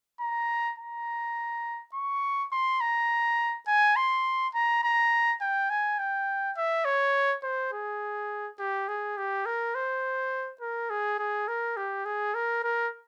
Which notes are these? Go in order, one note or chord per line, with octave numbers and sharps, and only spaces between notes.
A#5
A#5
C#6
C6
A#5
G#5
C6
A#5
A#5
G5
G#5
G5
E5
C#5
C5
G#4
G4
G#4
G4
A#4
C5
A#4
G#4
G#4
A#4
G4
G#4
A#4
A#4